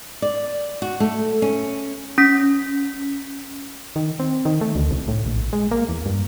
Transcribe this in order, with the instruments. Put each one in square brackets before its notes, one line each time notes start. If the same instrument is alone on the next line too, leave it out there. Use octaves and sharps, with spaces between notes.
[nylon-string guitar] D5
F#4
A3
C#4
[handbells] C#4 B6
[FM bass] D#3
C4
D#3
A3
D2
C2
A2
A#1
G#3
A#3
E2
G2